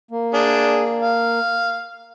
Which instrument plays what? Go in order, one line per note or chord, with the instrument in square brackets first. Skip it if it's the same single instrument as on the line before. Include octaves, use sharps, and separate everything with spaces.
[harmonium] A#3
[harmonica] D4 G#4
F5